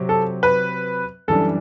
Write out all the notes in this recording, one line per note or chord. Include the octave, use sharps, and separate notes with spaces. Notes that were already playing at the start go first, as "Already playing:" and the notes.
Already playing: C3 F#3 C4 G4
A4
B4
F#2 E3 G3 D4 A4